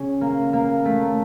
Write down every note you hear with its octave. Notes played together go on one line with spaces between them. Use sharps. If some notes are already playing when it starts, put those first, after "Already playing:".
Already playing: C#3 C#4
A#3
A#3
A3